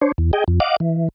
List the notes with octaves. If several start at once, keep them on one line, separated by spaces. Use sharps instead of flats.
D4 C5 C#5
E2
G#4 D#5 G5
F2
D#5 F5 F#5 D6
E3